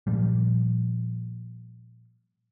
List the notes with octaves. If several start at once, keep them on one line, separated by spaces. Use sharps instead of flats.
A#2 F3 G3